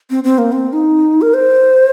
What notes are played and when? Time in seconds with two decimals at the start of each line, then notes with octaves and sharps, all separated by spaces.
0.10 C4
0.24 C4
0.38 A#3
0.52 C4
0.73 D#4
1.22 A#4
1.34 C5